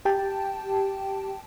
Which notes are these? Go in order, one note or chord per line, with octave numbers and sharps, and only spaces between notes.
G4 G5 A5